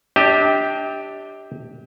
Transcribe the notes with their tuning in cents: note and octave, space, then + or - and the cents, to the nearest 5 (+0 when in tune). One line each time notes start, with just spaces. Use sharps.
D4 +0 G4 +0 E5 -45